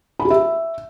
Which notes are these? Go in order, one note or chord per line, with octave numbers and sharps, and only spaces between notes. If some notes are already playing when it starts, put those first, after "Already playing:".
B5
G4
E5